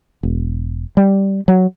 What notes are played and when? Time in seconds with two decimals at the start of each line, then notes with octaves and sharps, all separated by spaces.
0.23 E1
0.97 G3
1.48 F#3